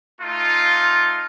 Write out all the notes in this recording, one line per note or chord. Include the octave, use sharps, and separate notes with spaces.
A3 D#4 F4